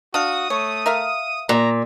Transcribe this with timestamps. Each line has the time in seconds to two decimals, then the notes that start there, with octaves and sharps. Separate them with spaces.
0.14 D4 F#4 F5 D#6
0.50 A3 C#5
0.86 A#4 E5 F5
1.49 A#2 A#5